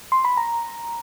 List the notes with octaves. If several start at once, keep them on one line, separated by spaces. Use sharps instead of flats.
C6
B5
A#5